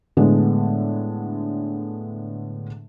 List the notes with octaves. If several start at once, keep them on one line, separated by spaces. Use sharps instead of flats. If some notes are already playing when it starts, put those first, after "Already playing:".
A2 D3 G#3 B3